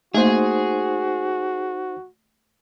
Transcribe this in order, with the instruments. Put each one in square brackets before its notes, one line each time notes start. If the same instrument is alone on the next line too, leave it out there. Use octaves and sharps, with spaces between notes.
[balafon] A3 A#3 [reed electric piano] D#4 C5 [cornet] F#4 [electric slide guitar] G#4